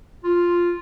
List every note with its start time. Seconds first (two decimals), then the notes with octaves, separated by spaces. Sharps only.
0.24 F4